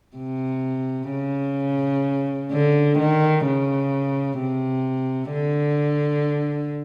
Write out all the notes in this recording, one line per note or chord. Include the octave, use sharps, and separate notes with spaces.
C3
C#3
D3
D#3
C#3
C3
D3